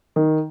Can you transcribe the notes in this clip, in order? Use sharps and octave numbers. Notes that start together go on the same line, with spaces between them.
D#3